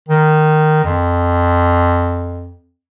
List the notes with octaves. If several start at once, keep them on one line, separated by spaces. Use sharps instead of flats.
D#3
F2